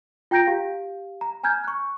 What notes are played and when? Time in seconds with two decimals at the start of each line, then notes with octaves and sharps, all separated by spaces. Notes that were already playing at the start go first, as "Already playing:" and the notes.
0.31 F4 G5 A#5 G6 A#6 D7
0.47 G4 F5
1.21 A#5
1.43 G#5 A#5 F6 G6 G#6
1.64 C#6 F#6